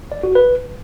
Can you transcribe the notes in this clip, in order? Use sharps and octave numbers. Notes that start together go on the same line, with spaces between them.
D5
F#4
B4